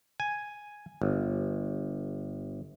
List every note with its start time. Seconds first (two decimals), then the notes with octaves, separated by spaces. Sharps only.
0.20 G#5
1.02 G1